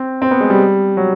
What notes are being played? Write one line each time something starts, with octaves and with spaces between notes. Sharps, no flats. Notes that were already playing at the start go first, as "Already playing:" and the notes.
Already playing: C4
C4
B3
G#3
G3
F#3